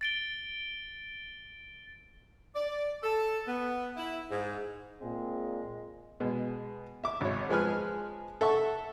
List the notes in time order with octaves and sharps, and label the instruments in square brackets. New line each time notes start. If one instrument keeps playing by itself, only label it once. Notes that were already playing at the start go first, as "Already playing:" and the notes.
[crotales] A6 D7 G7
[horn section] D5
A4
B3
E4
G#2
[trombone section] A#2 C4 G#4 [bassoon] G#3
[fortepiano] B2 G#3
E5 D6
G#1 C#5
F3 G#3 B4 G#5 F6
A4 E5 F#5 C#6